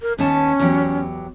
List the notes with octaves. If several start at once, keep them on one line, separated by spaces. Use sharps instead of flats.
A#4
D#2 B3 C#4 A5
E2 F#3 G4